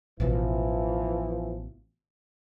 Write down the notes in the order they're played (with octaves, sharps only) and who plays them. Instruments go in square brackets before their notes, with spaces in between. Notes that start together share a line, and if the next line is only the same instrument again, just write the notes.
[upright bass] A1 B2 [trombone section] E3 F3